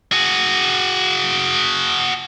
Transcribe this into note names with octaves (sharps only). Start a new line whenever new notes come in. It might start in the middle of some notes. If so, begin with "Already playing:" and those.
F#4 G#4